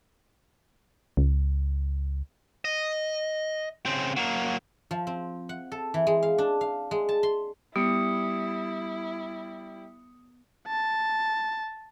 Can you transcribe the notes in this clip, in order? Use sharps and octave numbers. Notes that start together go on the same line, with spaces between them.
C#2
D#5
C#3 C4
F#3 A#3
F3
C4
F#5
A4
E3
G#3
F5
D4
F5
G#3
A5
C6
G3 B3 E4 D#6 C#7
A5